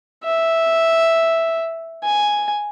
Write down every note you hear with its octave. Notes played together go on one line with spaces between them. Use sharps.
E5
G#5